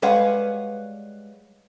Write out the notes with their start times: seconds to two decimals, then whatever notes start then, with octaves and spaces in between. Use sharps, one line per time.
0.02 G3 G#3 B4 C#5 F5 F#5